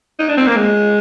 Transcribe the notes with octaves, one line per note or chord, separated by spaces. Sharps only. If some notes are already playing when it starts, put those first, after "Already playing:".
D#4
D4
C4
A#3
G#3